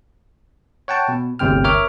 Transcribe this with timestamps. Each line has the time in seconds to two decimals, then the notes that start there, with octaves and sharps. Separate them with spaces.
0.88 C#5 F#5 G5 A5
1.09 B2
1.39 G1 D2 C3 G5 F6
1.64 A#4 C#5 E5 D6 F6